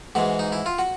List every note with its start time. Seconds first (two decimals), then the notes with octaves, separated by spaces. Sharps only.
0.15 G#2 E3 G#3 F#4
0.39 D#4
0.52 E4
0.66 F4
0.79 F#4